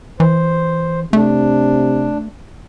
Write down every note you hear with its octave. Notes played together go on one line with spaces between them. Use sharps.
E3 C5
C3 A3 D4